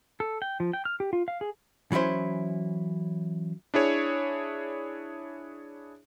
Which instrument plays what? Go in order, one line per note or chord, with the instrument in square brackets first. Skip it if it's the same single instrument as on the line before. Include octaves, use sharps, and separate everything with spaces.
[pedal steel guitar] A4
G5
F3
G5
F6
G4
F4
F5
G#4
[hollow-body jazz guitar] E3 F#3 C#4 E4 C5
[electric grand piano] D4 E4 G#4 C#5